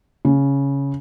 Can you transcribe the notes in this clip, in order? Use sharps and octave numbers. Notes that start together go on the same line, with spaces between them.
C#3